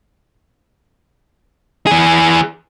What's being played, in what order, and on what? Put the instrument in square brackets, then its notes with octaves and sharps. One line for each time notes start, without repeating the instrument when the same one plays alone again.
[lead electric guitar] E3 G#4